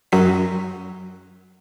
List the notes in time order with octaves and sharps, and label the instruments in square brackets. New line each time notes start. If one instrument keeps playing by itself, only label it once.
[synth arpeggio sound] F#2 F#3 B6